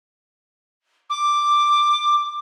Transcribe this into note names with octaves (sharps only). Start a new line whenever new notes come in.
D6